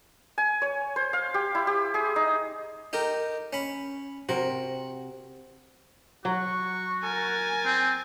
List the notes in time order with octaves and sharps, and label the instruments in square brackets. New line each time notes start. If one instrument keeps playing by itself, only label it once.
[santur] G#5
C#5
C5
F5
G4
E4
G4
G#4
D#4
[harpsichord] D#4 G4 A#4
C#4 B5
[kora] C3 A#4 [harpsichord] F#4
[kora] F#3 [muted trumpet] F#4 [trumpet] C#6
[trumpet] A#4 [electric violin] G#5 A6
[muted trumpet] C4